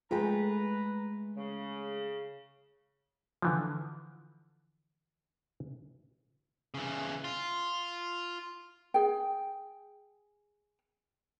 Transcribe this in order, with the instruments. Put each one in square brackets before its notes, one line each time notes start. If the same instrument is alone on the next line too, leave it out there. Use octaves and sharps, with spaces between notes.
[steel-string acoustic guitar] G#3 A3 [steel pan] F4 G#4 G5 [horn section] B4 A#5
[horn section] C#3
[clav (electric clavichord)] D3 E3 F3
[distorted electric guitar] C#3 E3
F4
[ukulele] G#4 G5